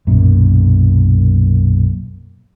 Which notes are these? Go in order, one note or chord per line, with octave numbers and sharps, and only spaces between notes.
B1 F#2 A#2